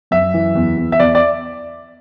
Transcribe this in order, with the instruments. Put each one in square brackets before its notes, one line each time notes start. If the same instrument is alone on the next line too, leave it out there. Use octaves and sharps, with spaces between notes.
[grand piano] F#2 E5
E3
E2
E2
E5
E2 D5
D5